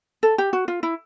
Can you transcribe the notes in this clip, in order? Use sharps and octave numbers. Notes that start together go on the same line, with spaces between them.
A4
G4
F#4
F4
E4